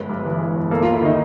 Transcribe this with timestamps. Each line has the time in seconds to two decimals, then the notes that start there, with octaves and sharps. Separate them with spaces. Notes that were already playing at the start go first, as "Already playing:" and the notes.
Already playing: G1 G#3 B4
0.09 G2
0.25 E3
0.39 G#3
0.56 G1
0.71 A#3 A4
0.82 F4
0.86 D#2
0.94 E4
1.02 D#3 D#4